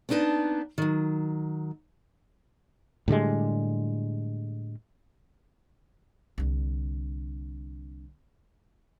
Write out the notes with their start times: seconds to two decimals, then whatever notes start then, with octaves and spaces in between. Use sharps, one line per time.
0.09 B3 C4 D4 D#4 B4 A5
0.78 D#3 F#3
3.08 A2 D3 G3 G#3
6.38 C2 D3